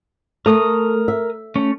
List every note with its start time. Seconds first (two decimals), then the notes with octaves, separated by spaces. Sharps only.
0.46 A3 A#4 D#6
1.08 E5
1.55 A3 C#4